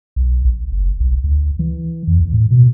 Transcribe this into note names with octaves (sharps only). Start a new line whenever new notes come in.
B1
A#1
F#1
B1
D2
E3
F2
D#2
A2
B2